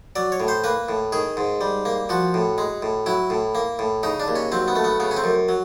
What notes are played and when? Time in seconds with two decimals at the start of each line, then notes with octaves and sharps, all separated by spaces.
0.16 F#3 D5
0.32 C#5
0.40 A2
0.48 C5
0.64 A#3 B4
0.89 A2
1.12 D#3 G#4
1.37 G#2
1.61 G3
1.85 A#3
2.09 F3 F#4
2.34 A2
2.58 G#3
2.82 A2
3.06 F#3 E4
3.30 A2
3.55 A#3
3.79 A2
4.03 C#3 D#4
4.20 D4
4.28 D#2
4.36 C#4
4.52 F#3 C4
4.68 B3
4.76 A3
4.84 B3
5.00 C#3 B3
5.11 C#4
5.17 C4
5.24 F#2
5.48 F#3